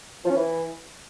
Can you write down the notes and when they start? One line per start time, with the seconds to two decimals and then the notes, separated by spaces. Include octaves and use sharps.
0.24 F3
0.30 C#4
0.36 E3